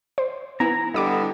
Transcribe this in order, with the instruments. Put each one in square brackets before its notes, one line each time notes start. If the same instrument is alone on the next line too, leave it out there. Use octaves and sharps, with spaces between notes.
[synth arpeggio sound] C5
[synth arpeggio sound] B3 [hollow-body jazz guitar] E4 G#5 [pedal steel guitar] A#5
[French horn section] D3 G3 [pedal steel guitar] B3 [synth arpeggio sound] D#5 D6 D#6